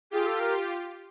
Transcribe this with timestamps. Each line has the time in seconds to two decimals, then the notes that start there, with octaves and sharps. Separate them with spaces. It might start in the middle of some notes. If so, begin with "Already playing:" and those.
0.11 F4 G4 G#4
0.26 A4
0.40 A#4